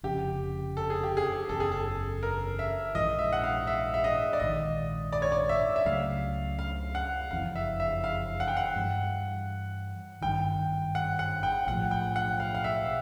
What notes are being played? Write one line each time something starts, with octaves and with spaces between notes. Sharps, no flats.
F1 F2 C#3 G4
A4
G#4
G4
G#4
F#1 E2 C#3 A4
G#4
A4
A#4
E5
A#1 G#2 E3 D#5
E5
F#5
F5
E5
E5
D#5
D5
A#1 G#2 D#3 D#5
D5
C#5
D5
E5
E5
C#2 C#3 F#3 A3 F5
F5
F#5
F#1 F2 C#3 E3 F5
E5
E5
F5
F#5
G5
F#5
G2 E3 G3
G#1 G2 D#3 G5
F#5
F#5
G5
B1 A2 F3 F#5
G5
F#5
F5
F5
E5